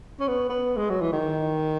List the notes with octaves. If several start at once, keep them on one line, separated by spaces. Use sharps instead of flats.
C#4
B3
B3
G#3
F#3
E3
D#3